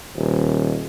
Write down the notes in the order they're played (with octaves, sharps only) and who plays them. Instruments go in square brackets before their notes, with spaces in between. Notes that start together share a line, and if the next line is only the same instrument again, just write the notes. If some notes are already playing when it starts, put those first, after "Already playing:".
[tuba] D#1